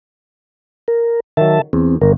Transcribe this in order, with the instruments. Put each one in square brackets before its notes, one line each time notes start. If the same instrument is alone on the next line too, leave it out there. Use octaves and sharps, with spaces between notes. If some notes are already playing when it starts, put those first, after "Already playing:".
[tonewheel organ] A#4
[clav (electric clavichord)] D#3 F#3 [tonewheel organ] E5 A5
[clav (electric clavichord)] E2 [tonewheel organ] C4
[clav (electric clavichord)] G1 [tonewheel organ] A#4